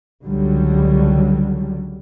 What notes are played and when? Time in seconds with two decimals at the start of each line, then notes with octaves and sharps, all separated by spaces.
0.25 C#2 D3 F#3 G3